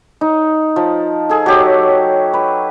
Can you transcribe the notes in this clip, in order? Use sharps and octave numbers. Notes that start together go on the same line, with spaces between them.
D#4
F3
G#4 A4
F#3 G4 C#5
B4